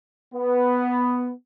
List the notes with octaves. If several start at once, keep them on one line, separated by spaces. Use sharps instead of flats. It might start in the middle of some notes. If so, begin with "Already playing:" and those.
B3